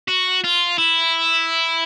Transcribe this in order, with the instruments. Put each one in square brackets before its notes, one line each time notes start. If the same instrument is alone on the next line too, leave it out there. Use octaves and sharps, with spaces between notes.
[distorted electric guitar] F#4
F4
E4